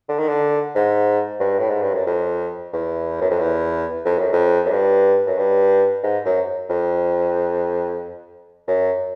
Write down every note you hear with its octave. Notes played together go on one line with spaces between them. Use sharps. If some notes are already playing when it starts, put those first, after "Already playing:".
D3
D#3
D3
G#2
G2
A2
G#2
G2
F#2
F2
E2
F#2
F2
E2
F2
F#2
F2
F#2
G2
F#2
G2
G#2
F#2
F2
F#2